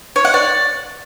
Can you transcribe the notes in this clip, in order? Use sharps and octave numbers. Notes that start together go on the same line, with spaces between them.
C#5
F#5
D5